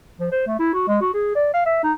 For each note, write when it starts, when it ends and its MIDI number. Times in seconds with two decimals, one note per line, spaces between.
0.19 0.29 53
0.31 0.44 72
0.47 0.58 57
0.59 0.72 64
0.74 0.85 66
0.88 1.00 56
1.01 1.11 66
1.14 1.34 68
1.35 1.50 74
1.54 1.65 77
1.66 1.82 76
1.83 1.93 63